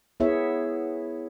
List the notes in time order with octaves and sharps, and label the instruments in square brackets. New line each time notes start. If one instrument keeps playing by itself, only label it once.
[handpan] B3 E4 G#4 C#5 E5